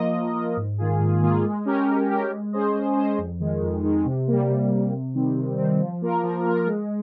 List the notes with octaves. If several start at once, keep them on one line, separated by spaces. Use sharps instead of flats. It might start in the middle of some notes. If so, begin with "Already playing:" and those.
Already playing: F3 A#3 F4 A#4 D#5
F3
A#3 F4 A#4 D#5
G#2
D#3 A#3 F4 G#4
G#2
D#3 A#3 F4 G#4
G#3
C#4 G4 A#4
G#3
C#4 G4 A#4
G#3
C#4 G#4 C5 D#5
G#3
C#4 G#4 C5 D#5
F2
D#3 G#3
F2
D#3 G#3
C3
G3 A#3
C3
G3 A#3
C3
D#3 G3 C4
C3
D#3 G3 C4
F3
A#3 F4 A#4
F3
A#3 F4 A#4
G#3